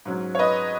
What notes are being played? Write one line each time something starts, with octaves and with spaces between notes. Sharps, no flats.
G#2 F#3 C#4
C#5
B4 D#5